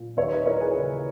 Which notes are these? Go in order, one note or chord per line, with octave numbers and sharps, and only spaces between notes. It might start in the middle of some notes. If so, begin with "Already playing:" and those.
Already playing: A#2
D#2 C#5 E5
B4 D#5
E3 A#4 C#5
G#4 B4
C#3 E4 G#4